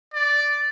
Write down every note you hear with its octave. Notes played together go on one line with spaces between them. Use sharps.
D5